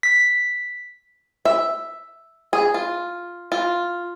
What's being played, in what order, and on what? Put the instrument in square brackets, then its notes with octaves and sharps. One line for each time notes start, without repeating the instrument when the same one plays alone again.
[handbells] B6
[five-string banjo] E5
G#4
F4
F4